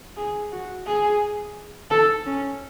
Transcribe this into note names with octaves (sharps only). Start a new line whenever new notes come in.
G#4
F#4
G#4
A4
C#4